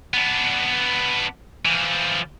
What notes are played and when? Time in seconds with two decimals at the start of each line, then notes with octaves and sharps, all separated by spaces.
0.14 B3 D4
1.65 E3 F3